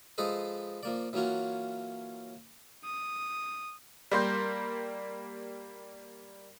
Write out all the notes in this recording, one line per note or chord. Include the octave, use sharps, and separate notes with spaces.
F3 G#3 A4 B4 C5 D#5
F3 A#3 D5
E3 F#3 A#3 C#4 F4 F#4
D#6
G3 A#3 C6 G6